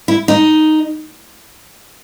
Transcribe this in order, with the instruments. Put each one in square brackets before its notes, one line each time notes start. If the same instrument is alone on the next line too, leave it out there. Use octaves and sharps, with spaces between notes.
[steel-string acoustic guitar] E4
D#4